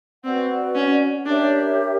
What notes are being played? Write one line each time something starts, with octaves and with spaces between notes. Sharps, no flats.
C4 F#4 B4 D5 F#5
C#4
D4 G4 A#4 C#5 E5